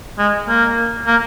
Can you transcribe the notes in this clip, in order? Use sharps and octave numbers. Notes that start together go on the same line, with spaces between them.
G#3
A#3
A#3